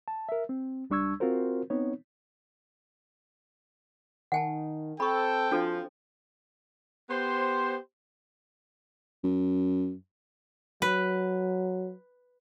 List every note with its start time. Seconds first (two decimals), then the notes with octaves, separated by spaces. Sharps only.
0.08 A5
0.29 A#4 E5
0.49 C4
0.90 C#2 G3 D4 C#6 E6 G#6
1.20 C4 F4 F#4 A#4 C5
1.70 B3 C4 D#4 C#5
4.32 D#3 F#5 G#5 A5
5.00 C4 A4 G5 B5 C#6
5.51 F3 D4 F#4 A4
7.10 B3 G4 C5
9.24 F#2
10.82 F#3 B4